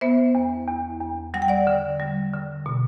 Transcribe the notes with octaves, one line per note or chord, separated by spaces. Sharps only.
B3 C5 E5
E2
E2
E2
G3 F#5
G5
D5 F#5
D3
G3
D3
B2